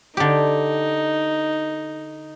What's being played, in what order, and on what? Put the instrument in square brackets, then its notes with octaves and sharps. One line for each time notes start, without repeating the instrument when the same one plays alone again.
[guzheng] D3 G4 [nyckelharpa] D#4